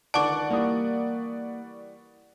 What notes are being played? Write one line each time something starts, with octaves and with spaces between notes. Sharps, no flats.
C#2 D3 D#3 D5 F#5 A5 C#6 D6
E3 G3 A#3 D#6